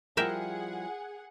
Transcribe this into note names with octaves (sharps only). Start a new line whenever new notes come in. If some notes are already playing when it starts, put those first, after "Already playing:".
F3 G3 E4 G#4 A#4 E5 F#5 G5